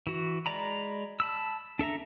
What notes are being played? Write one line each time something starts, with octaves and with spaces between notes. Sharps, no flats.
E3 F#4
G#3 D5 A#5 B5
A5 B5 E6
D4 A4 E5 A#5